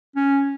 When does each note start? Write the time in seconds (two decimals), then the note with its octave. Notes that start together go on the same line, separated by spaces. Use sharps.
0.16 C#4